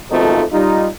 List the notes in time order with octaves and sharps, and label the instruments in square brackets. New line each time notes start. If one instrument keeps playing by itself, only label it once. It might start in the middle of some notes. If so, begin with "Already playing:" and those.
[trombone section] G#1 F2 B2 F3 A3 D#4
G3 D#4 F4